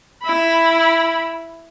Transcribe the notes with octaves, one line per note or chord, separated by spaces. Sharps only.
E4 B5